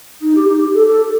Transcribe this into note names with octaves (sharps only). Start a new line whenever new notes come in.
D#4
G4
D#4
G4
A4
A4